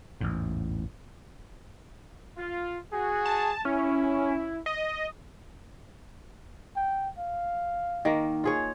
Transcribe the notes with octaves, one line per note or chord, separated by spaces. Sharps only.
A1 E2 G#2
F4
F#4 G#4
A5
C#4 E4
D#5
G5
F5
D#3 A#3
F4 G#4 C#5